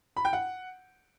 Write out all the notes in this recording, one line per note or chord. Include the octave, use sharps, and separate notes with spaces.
B5
G5
F#5